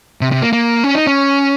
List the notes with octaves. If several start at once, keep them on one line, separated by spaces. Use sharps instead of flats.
C3
C3
A#3
A#3
C#4
D#4
C#4